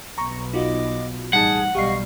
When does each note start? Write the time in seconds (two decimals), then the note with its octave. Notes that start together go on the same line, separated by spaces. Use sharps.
0.18 B1 B3 A#5 C#6
0.53 D#4 F4 F#4 D#5 D6
1.33 A1 G3 D#4 G#4 F#5 A5 G#6
1.75 B1 G3 G4 D#5 F5 C#6 C7